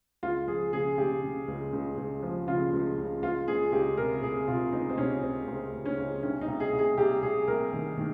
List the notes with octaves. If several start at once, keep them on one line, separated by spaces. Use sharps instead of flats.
C#2 F4
F3 G#4
C#3 G#4
C#3 G4
C#3
C#2
C#2
C#2
F3
C#3 F4
C#2
C#2
C#2 F4
C#2 G#4
C#2 G4
C3 A#4
C3 G#4
C3 F4
C#2 D#4
C4
C3 C#4
C#2 C4
C#2 C4
C#2
C#4
C#2
C2 C#4
D#4
C2
G#4
C2
G#4
C2 G4
C2 G#4
C2 A#4
D#3
D#3